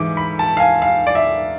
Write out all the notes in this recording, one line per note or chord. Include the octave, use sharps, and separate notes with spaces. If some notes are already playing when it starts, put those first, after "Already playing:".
Already playing: G#2 E3 D6
B5
A5
F5
G#5
F5
D5
E5